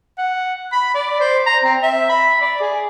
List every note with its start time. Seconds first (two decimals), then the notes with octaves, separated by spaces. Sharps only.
0.18 F#5
0.72 B5
0.95 D5
1.21 C5
1.47 A#5
1.64 C4
1.83 E5
2.09 B5
2.41 D5
2.60 G#4